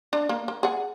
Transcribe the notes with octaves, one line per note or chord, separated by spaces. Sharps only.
D4
A#3
A#3
G#4 F#5